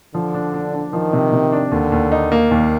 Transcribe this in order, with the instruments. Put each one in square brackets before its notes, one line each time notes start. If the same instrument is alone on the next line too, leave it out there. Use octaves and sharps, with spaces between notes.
[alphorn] D3 [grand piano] F3
[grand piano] D4
D4
D4
[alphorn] D#3 [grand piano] F3
[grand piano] C3
C3
D4
[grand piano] D#2 [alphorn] D3
[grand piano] D#2
D#4
A#3
D#2